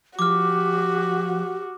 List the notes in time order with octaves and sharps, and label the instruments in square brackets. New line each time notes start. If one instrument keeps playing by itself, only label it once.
[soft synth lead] F3 [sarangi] F#4 [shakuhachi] G4 [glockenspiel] D6 F6